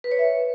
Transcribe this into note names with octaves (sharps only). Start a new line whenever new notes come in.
B4
C#5
E5